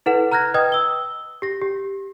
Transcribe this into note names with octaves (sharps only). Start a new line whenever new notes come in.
E4 A4 B4 F#5 E7
A#5 F6 F#6 G#6 A#6
B4 D#5 G5 D#6 G#6
E6 G7
G4 A#6
G4